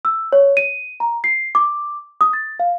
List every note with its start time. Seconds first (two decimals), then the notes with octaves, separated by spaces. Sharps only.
0.05 E6
0.33 C#5
0.57 D#7
1.00 A#5
1.24 C7
1.55 D6
2.21 D#6
2.33 A6
2.60 F5